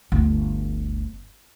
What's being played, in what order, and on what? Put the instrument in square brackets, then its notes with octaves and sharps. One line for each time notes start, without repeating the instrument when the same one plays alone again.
[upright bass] G1 D2